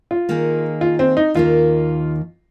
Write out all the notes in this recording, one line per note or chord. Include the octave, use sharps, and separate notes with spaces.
F4
D#3 A#3 D#4 G#4
F4
C4
D#4
D#2 D#3 A#3 F4